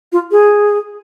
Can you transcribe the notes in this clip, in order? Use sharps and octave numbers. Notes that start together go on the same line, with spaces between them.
F4
G#4